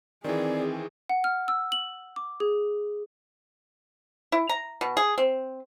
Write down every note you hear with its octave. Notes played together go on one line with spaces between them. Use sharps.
D#3 E3 C4 G#4 D5
F#5
F6
E6
F#7
D6
G#4
E4
A#5
B2
G#4
C4